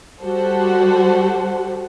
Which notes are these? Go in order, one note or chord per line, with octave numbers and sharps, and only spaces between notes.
G3 F#4 G4 A4 C5 F#5